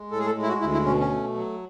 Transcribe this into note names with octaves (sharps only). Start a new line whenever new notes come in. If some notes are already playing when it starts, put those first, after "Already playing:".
Already playing: G#3
A2 A4
G#4
A4
G#3
E4
F#4
D2 E4
E4
B2 C#4
C#4
A3
F#3